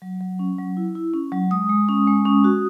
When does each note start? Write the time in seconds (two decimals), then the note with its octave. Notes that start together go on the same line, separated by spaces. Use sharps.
0.02 F#3
0.21 F#3
0.39 C#4
0.59 F#3
0.77 E4
0.95 E4
1.14 C#4
1.32 F#3
1.51 G#3 D#6
1.69 G#3
1.89 C#4
2.07 G#3
2.25 C#4
2.44 F#4